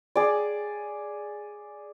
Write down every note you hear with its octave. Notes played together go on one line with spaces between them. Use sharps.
G#4 D5